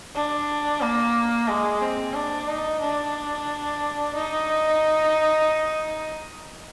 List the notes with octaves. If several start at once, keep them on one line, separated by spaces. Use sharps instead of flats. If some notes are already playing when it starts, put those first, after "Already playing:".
D4
A#3
G#3
C4
D4
D#4
D4
D#4